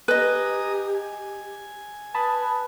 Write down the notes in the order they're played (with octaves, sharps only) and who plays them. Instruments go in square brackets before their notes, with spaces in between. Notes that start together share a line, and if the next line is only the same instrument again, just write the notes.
[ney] G4 [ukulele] B4 D#5 [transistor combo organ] G#5 A#5 D#6
[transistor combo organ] G#5
[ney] B4 [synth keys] A5 B5 D#6